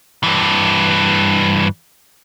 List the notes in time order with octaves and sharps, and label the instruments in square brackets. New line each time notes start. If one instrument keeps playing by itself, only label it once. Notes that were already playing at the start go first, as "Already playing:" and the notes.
[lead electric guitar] G2 E3